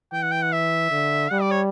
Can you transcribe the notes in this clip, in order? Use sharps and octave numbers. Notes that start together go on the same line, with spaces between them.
E3 G5
F#5
G5
F#5
E5
D3
G3 F#5
D5
C#5